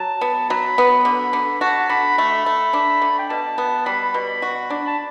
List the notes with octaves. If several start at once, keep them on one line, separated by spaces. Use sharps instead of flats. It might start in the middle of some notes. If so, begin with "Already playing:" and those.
Already playing: F#3 A5
B3
F#3 B5
B3
D3
D3
F#4 A5
D3 B5
A3 B5
A3
D4
D3
G5
B2 A5
B3
G3 B5
B2
F#4
D4
A5